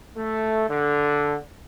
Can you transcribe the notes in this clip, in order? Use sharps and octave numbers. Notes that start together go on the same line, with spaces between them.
A3
D3